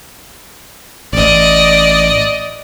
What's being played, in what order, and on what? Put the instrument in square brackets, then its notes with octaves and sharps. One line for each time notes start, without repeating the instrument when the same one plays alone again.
[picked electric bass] A1 [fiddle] D5 D#5